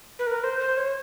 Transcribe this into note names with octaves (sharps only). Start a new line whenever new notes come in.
B4
A#4
C5
C5
C#5